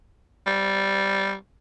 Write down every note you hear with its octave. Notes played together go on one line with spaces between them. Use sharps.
G3